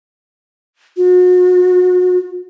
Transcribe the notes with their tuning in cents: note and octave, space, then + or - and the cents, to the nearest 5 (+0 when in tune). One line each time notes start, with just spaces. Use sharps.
F#4 -35